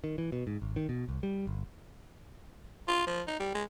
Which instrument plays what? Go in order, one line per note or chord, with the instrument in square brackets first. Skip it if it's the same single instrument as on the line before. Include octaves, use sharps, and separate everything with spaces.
[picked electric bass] D#3
E3
B2
G#2
G#1
D#3
B2
C2
G3
G1
[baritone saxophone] F4
F3
D#4
G3
G#3